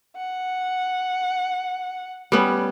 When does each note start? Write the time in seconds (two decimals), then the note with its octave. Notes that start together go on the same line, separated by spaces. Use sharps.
0.16 F#5
2.32 G3 B3 C#4